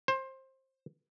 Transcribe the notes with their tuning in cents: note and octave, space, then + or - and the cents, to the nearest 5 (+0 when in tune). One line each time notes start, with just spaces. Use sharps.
C5 +20